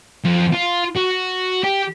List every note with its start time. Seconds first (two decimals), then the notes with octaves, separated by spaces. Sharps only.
0.24 F2
0.53 F4
0.96 F#4
1.64 G4